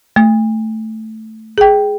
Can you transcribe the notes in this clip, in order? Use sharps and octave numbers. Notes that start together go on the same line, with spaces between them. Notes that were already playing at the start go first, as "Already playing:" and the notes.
A3
G#4 G5